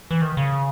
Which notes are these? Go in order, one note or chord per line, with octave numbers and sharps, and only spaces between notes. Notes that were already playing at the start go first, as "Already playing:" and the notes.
E3
D#3
C#3